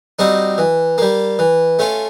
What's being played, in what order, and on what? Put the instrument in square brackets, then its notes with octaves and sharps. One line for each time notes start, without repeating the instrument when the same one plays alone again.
[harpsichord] G3 C4 D#4 F#4
E3
G3 A#3
E3
A3 C#4 F4